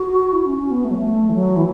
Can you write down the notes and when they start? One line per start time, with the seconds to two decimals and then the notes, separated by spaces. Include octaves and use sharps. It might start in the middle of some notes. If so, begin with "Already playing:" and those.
Already playing: F#4
0.32 E4
0.45 C#4
0.58 C#4
0.70 B3
0.84 A3
0.90 F#3
0.97 A3
1.29 E3
1.34 F#3
1.56 E3